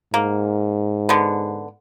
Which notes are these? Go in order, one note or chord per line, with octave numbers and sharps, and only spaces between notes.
G#2 A#3
D3 B3